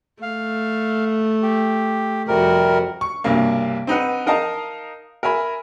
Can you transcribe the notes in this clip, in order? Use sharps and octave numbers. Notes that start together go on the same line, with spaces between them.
A3 F5
G4
F2 C3 G3 F#4 A#4
C#6
B1 G2 C3 A#3
C4 D#4 B4 F#5
D#4 A#4 D#5 F5 A5 A#5
A#4 E5 G#5 B5